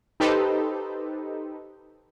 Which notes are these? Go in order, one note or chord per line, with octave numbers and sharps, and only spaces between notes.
D#4 G4 A4 B4 C5